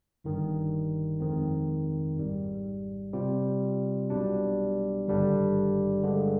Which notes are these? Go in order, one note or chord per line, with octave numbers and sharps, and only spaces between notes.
G1 G2 D#3
F2 D#3 G#3 C4
G#1 G#2 G3
C3 G3 C4 F4
B1 B2 G3 D4
G#1 G2 D3 G3 D4
G2 D3 G#3